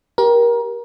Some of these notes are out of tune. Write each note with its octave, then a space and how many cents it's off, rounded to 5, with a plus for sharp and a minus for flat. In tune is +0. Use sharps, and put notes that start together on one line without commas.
G4 +0 A#4 +25